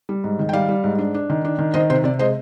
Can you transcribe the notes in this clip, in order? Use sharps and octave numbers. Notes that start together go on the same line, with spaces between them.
G3
G#2
D#3
G5
G3 D5 F5
G3
G#2
D4
D4
D#3
D4
D#3
D#3 C5 D#5
C3 C5
C3 D5
G#3 C5 D#5